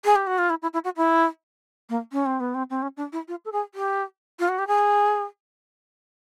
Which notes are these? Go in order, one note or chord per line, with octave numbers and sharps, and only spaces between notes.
G#4
G4
F#4
F4
E4
E4
E4
F#4
E4
A#3
C#4
C4
B3
C4
C4
C#4
D4
E4
F4
A4
G#4
G4
F4
F#4
G4
G#4